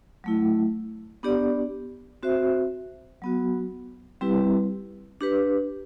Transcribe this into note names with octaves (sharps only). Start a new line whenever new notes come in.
F#3 A3 E4
B3 D4 G4 D5
C4 F#4 C5 E5
F#3 B3 F#4
G3 C4 E4 G4 B4
D4 G4 B4